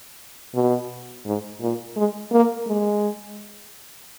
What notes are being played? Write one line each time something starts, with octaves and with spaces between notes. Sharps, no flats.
B2
G#2
A#2
G#3
A#3
G#3